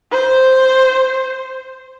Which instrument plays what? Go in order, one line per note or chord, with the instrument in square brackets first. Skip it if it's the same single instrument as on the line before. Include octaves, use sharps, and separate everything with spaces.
[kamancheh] C5